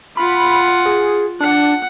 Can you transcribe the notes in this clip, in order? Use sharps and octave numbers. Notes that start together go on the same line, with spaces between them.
F4 F#5 B5
G#4
D4 F#5